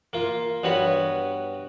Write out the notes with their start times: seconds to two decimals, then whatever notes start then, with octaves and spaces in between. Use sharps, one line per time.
0.13 A#3 F4
0.63 G2 B3 F#4 C#5 B5